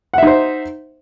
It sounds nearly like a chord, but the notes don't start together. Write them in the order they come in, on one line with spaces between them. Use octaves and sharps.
F#5 E5 D#4 C5